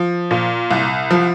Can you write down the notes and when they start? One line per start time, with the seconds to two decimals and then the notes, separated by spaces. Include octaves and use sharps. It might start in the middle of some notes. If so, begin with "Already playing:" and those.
Already playing: F3
0.31 A#2
0.71 C2
1.11 F3